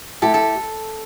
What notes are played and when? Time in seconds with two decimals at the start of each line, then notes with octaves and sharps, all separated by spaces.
0.22 A3 E4 G4 A4
0.34 A4